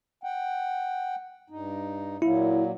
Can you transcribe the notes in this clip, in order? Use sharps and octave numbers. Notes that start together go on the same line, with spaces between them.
F#5 G5
G2 D#4
A#2 F#3 A#3 E4